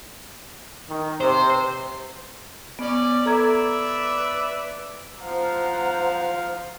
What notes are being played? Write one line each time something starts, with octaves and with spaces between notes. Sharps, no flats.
D#3
C3 C5
B3 C#4 D5
A4 B4 D5 E5 A#5 G#6
F3 C5 F5 F#5 A#5